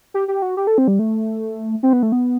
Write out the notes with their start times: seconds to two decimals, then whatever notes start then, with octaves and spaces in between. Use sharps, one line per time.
0.14 G4
0.28 G4
0.42 F#4
0.57 G4
0.67 A4
0.78 C4
0.88 G3
0.99 A3
1.83 C4
1.93 B3
2.03 A3
2.12 B3